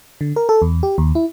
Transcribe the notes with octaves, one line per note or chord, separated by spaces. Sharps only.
D3
A#4
A4
E2
G4
D#2
E4